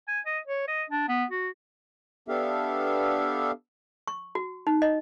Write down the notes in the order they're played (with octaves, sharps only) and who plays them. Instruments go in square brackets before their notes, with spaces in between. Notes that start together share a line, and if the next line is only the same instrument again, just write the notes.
[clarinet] G#5
D#5
C#5
D#5
D4
B3
F#4
[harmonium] B3 D4 G4 A4 E5 F5
[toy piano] C#6
F#4
D#4
D#5